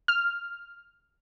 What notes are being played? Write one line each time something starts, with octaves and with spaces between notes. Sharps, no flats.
F6